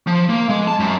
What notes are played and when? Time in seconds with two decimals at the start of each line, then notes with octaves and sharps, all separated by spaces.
0.07 F3
0.29 A#3
0.49 G#3
0.67 A5
0.80 F#2